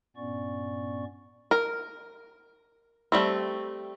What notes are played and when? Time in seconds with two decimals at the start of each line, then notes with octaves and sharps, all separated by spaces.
0.16 G2 A#2 B3 C#4 D5 C#6
1.51 A#4
3.12 G3 A3 C4